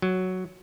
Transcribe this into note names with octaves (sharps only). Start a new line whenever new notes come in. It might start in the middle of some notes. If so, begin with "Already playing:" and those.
F#3